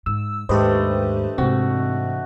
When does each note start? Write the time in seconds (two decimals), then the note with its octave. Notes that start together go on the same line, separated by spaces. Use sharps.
0.06 G#2 E6
0.49 D#2 G#2 A3 D4 G4 B4 C5 D#5
1.38 G#2 C3 E3 C4 F#4